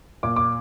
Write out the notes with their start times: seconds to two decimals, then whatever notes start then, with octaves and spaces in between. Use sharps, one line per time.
0.23 A#2 D6
0.36 D6